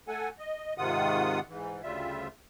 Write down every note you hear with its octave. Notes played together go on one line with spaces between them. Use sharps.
A3 A4 F#5 G#5
D#5
G#2 C3 D#3 F4 F#5 D#6
G#2 E3
D2 C#3 G3 F4 E5